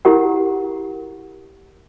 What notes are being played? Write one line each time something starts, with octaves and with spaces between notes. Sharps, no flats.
E4 G4 A#4 F#5